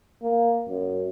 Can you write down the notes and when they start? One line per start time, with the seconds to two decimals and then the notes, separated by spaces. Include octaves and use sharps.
0.22 A#3
0.69 F#2